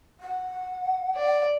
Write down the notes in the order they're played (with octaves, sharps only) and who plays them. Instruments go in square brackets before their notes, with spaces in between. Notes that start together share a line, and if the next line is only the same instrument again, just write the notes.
[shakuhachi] F#5
[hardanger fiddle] D5